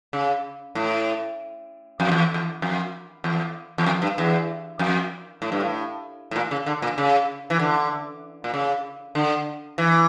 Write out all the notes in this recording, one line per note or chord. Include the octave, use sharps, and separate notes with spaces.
C#3
A2
F2
E2
E2
F2
E2
E2
F2
G2
E2
F2
A2
G2
A2
A2
A#2
C#3
D3
A#2
C#3
E3
D3
A#2
C#3
D3
E3